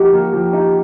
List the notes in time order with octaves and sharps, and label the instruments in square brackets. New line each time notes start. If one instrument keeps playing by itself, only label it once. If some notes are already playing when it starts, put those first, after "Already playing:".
Already playing: [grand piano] F3 A#3 D#4 F#4 [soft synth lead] G4
[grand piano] A#3
F3
D#4